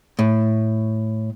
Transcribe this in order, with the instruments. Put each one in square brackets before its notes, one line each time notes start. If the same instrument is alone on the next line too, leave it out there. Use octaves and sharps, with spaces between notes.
[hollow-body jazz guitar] A2